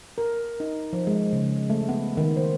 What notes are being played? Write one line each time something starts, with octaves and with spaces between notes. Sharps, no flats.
A#4
D#4
F3
G#3
C#3
A3
B3
D#3
C5